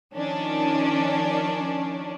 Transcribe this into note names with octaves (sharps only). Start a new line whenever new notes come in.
D#3 F3 C#4 D4